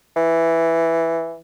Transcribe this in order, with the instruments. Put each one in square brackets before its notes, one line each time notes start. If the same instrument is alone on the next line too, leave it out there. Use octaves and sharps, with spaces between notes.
[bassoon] E3